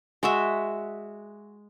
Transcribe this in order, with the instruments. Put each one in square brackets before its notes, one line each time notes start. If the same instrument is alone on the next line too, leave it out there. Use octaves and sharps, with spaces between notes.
[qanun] G#3 F#4 E5